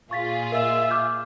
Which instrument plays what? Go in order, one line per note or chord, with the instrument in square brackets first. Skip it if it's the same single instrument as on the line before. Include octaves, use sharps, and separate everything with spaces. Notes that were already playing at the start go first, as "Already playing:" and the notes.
[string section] A#2 F4 G#4 [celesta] C#6 A6 B6
[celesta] A#4 D#5 [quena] E5
[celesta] D6 F6 G6